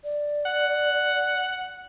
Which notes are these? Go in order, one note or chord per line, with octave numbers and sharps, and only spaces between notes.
D5
F#5